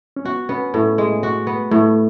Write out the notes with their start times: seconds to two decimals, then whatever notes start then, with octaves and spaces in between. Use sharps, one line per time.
0.16 C#4
0.25 B3 F#4
0.49 B3 C#4
0.74 A2 A3
0.98 G#3
1.23 F#4
1.47 B3
1.71 A2 A3